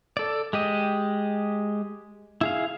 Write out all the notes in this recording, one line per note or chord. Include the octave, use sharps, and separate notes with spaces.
A4 D5
G#3 G4 D#5
E4 G#4 F5